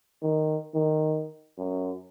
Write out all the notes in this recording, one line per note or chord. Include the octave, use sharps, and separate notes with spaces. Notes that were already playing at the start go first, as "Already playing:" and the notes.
D#3
D#3
F#2